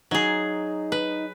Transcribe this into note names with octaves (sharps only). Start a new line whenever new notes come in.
F#3 D#4 G#4
B4